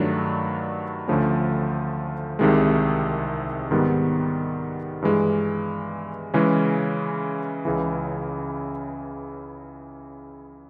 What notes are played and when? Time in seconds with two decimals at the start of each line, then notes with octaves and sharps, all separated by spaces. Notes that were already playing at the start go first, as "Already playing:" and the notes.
Already playing: G2 D#3 F#3 A3 D4
1.08 D2 D3 F3 A3 C#4
2.39 C2 C3 D#3 G#3
3.71 G#2 D#3 G3 B3
5.02 G2 E3 G#3
6.34 C#3 E3 G#3 C#4
7.65 C#2 C#3 E3